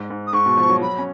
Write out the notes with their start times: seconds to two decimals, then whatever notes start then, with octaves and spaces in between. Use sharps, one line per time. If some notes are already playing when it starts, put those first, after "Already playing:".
Already playing: G#2
0.10 G#2
0.27 D#6
0.33 G#2 C#6
0.46 B2
0.57 F3
0.69 F#3
0.81 F#3 B5
0.98 C#4